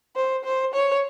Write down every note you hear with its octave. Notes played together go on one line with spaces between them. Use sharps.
C5
C5
C#5